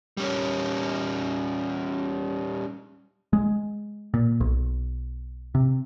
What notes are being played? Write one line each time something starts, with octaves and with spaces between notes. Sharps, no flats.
G3 C#4
G#3
A#2
B1
C3